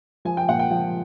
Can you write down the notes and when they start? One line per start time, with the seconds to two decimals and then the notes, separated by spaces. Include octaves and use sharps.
0.25 F3 G#5
0.37 G5
0.49 A#2 F#5
0.59 G5
0.70 F3